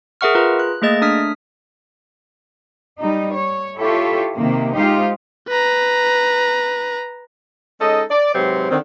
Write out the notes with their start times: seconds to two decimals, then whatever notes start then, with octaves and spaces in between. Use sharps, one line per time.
0.21 G#4 A#4 E5 F#5 C#6 F6
0.35 F4 G#4 B4 A#5
0.59 F#6
0.82 A3 A#3 G#4 D#5 A6
1.01 A3 D4 D#6 F6 B6
2.98 G3 D#4
3.33 C#5
3.77 E4 F4 G4 A4 C#5 E5
4.34 C3 D#3 A#3
4.75 G#3 D#4 F4 G4 C5 F5
5.48 B4 A#5
7.81 G#3 C#4 D#4 A4 D#5
8.11 D5
8.35 G#2 C3 F#3 C4 B4 C5
8.71 D3 D#3 C4